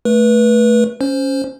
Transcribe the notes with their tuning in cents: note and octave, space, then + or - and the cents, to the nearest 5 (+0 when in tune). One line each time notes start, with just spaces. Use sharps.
A3 +0 B4 -25
C#4 +0 C5 +0